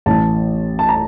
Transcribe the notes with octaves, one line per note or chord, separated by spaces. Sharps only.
A1 A2 E3 A5
A5
A#5